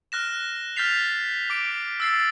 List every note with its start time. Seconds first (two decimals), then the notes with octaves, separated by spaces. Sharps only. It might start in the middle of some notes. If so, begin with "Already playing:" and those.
0.12 F6 F#6 A#6 E7
0.76 F6 G6 A6 B6 C7 F7
1.50 D6 D7
2.00 E6 A6 C7